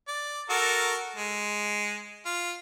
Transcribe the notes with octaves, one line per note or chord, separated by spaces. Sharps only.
D5
F#4 A4 A#4
G#3
F4